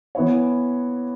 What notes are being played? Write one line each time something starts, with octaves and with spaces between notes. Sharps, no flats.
E3 B3 E4 C#5